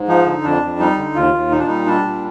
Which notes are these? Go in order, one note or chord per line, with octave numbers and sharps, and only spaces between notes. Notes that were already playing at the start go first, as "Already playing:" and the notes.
Already playing: G#2
F3 D#4
D3
F2 D4
F2
G3 D#4
D3
D#2 F4
D#2
A#2 D#4
D4
G3 D#4
G3 D4
A#2